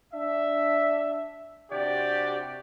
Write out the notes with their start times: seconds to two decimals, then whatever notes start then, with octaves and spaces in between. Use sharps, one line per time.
0.13 D4 E5
1.71 C3 D4 F#4 G4 D5